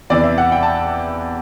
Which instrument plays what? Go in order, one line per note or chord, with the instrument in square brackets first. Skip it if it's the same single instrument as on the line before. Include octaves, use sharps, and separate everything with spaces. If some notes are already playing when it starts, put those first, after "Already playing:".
[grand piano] E2 C3 E3 D5
E5
F#5
G5
A5